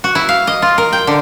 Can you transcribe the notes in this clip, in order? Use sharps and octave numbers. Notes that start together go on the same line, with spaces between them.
F#4
E4
F5
D#5
F4
A#4
G5
D3